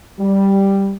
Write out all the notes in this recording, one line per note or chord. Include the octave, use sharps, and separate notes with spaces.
G3